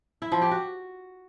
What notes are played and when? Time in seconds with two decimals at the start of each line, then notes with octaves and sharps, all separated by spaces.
0.22 E4
0.32 F3
0.41 G4
0.51 F#4